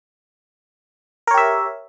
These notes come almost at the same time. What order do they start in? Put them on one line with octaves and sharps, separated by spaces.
A#4 C#5 G4 E5